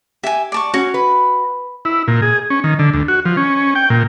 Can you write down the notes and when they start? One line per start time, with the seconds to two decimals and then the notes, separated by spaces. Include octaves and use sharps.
0.24 G4 E5 G#5
0.52 D5 A5 C#6
0.74 C#4 F#4
0.94 B4
1.85 E4
2.08 A#2
2.22 G#4
2.50 C#4
2.64 D#3
2.79 D3
2.94 D2
3.08 F#4
3.25 F3
3.37 C#4
3.75 G5
3.90 A#2